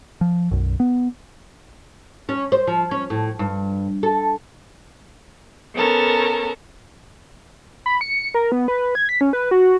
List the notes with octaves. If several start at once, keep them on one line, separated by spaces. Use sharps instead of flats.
F3
B1 F#2
B3
C#4
C5
F3
C#4
A2
G2
A4
B3 C#4 A4 A#4 A5
B5
C#7
A#4
B3
B4
G#6
B6
C#4
B4
F#4